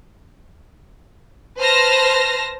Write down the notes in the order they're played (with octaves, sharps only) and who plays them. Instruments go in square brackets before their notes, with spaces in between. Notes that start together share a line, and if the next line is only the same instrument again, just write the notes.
[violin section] B4 C5 A5 F6 A#6